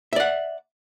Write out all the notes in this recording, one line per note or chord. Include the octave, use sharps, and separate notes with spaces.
D5 E5 F#5